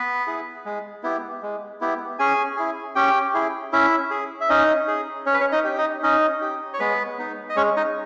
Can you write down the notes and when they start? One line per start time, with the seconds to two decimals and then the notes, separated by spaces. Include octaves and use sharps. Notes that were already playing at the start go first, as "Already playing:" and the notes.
Already playing: B3 B4
0.27 E4 G#4
0.65 G#3
1.03 B3 E4 G4
1.42 G#3
1.81 B3 E4 G4
2.19 C#4 G#4 G#5
2.57 E4 G#4
2.95 C#4 G4 G5
3.34 E4 G#4
3.72 C#4 E4 E5
4.11 G#4
4.41 E5
4.49 C#4 D#4 D#5
4.88 G#4
5.26 C#4 C#5
5.34 B4
5.41 C#4 C#5
5.52 D#4 D#5
5.64 G4
5.78 D#4 D#5
6.03 C#4 D#4 D#5
6.42 G4
6.73 C#5
6.80 G#3 B3 B4
7.18 B3 D#4
7.49 D#5
7.56 G#3 C#4 C#5
7.76 D#4 D#5